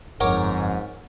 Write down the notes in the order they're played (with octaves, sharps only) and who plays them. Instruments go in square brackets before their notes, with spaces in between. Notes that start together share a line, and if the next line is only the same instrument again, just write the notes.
[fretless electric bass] G1 F2 [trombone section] G#2 [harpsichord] A#4 C#5 D6 [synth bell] F#5